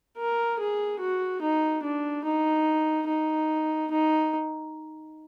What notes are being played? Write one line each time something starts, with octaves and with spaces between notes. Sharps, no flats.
A#4
G#4
F#4
D#4
D4
D#4
D#4
D#4